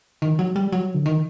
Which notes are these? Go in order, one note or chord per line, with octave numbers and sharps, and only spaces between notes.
D#3
F#3
G3
F#3
D3
D#3